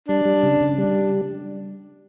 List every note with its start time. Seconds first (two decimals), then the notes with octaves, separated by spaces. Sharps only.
0.08 G3 D4
0.25 G3
0.43 C#3
0.61 C#3
0.78 G3 D4